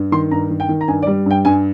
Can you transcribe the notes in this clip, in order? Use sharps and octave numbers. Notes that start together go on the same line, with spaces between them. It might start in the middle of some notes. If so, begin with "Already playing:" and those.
Already playing: G2
D#3 C6
G2 A#5
D#3
G5
D#3
A#5
G2 G#5
D5
G3
G2 G5
G2 G#5